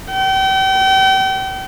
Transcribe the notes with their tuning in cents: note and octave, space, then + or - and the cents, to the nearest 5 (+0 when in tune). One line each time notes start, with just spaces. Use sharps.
G5 -35